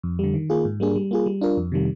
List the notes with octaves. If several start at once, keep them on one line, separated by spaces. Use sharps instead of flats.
F2
D3 G3
D#3
A#3 F4 G#4
G#2
G3 A#3 D4 G#4
G3
A#3 F4 G#4
G3
D4 F4 A#4
F2
C3 D#3 G3